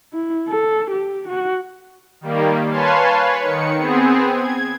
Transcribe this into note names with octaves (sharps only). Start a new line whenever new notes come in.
E4
A4
G4
F#4
D#3 G3 A#3
B4 C#5 F5 G#5 A5 C6
B4 C#5
D#3 C#7
B3 C4 G#4
G#6